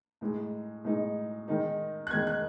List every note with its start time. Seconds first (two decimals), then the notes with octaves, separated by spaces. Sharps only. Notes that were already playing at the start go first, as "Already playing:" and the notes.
0.21 A2 G#3 D#4
0.84 A2 G#3 D#4
1.48 D#3 G#3 D#4
2.07 F#6
2.11 D#3 G#3 D#4 G#6
2.27 F#6